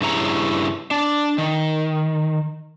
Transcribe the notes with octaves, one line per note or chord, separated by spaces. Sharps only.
G2 C#3 E4 C#5 A#5
D4
D#3